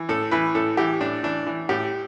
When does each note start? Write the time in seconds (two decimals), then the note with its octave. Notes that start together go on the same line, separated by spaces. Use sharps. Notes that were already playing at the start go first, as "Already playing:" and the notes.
Already playing: E3
0.09 A2 A4
0.31 E3 B4
0.55 A2 A4
0.77 E3 G4
1.01 A2 D4
1.23 E3 D4
1.47 E3
1.69 A2 G4